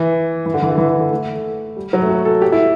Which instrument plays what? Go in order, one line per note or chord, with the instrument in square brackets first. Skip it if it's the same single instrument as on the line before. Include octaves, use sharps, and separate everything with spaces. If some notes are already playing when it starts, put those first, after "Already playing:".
Already playing: [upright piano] E3
E3
D3
E3
D3
E3
D3
D3
A3
G3
F#3
A3
F#4
A4
G4
E4